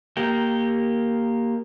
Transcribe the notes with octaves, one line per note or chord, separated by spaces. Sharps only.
A#3 G4